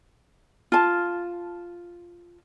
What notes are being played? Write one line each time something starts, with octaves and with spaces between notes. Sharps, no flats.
F4 A5